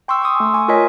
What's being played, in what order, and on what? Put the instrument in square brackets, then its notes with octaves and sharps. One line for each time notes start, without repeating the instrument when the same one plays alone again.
[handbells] G5 C6 C#6 E6
C6 C#6 D#6
A3 G#5
G#5 C#6
F4 A#4 C#5 D#5 G#5 B6